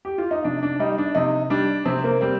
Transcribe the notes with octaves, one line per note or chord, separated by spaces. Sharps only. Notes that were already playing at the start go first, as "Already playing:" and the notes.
G4
F4
D#4
C3 D4
D4
G3 D#4
D4
C3 D#4
G3 D4
C3 C4
A#3
G3 C4